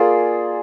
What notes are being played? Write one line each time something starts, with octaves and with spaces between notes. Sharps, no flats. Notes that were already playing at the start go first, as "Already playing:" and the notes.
Already playing: A#3 F4 G#4 D5